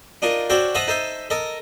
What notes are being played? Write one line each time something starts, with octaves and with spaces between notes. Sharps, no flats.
D4 D#4 F4 A#4
D4 F#4 A4 C5 C#5 G5
A4 B4 C5 D#5 E5 F#5
D#4 A4 C5 E5
A4 A#4 D#5